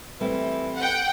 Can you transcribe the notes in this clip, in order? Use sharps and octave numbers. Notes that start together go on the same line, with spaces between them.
E3 G3 A3 C4
F#5 G5